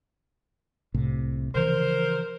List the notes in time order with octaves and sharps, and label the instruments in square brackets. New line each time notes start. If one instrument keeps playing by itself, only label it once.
[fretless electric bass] C2 A2 C3
[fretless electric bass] C#3 E3 F3 [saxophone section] A#4 C5